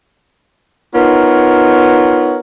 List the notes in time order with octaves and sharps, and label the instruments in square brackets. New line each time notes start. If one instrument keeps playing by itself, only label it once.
[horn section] B3 D#4 F4 A#4 C#5